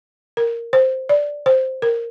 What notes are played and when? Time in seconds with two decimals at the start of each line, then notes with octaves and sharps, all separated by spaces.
0.37 A#4
0.73 C5
1.09 D5
1.46 C5
1.82 A#4